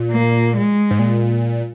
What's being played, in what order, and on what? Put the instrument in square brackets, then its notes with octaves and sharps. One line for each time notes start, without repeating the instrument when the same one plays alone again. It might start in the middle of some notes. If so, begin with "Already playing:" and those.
Already playing: [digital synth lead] A#2
[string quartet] A#3
G#3
[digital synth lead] G#2
A#2